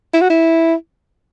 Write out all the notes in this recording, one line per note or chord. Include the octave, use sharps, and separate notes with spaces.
E4
F#4
E4